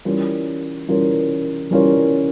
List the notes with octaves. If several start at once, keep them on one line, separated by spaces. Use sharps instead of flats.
E3 G3 C#4 F4 A#4
E3 G3 C#4 F4 A#4
E3 G3 C#4 F4 A#4